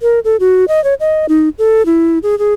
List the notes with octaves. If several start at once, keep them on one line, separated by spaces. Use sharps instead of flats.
A#4
A4
F#4
D#5
C#5
D#5
D#4
A4
E4
G#4
G#4